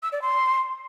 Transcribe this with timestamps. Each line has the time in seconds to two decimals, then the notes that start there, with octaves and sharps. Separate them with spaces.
0.03 E6
0.12 D5
0.22 C6